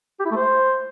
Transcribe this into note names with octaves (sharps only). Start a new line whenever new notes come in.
G4
E4
A3
C5